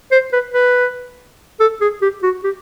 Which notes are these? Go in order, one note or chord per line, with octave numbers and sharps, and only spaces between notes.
C5
B4
B4
A4
G#4
G4
F#4
G4